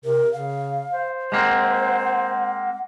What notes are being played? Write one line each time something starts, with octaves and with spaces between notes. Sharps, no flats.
C3 A#4
C#3 F5
C5
G#3 A#3 C4 F#5